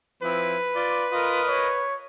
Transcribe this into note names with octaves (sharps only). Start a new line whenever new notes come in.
F3 C4 E4 B4
F4 D5
F4 A#4 D#5
C#5